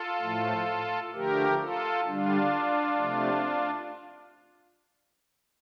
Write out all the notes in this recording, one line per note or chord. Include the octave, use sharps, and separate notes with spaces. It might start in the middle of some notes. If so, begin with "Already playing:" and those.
Already playing: F4 A4
A2 F3 A3
D3 F3 A3 G4 A#4
F4 A4
D3 G3 D4 F4
C3 F3 A3